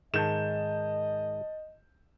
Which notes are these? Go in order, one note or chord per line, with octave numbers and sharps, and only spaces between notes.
G#2 D#3 G#3 D#5 A5 G6 E7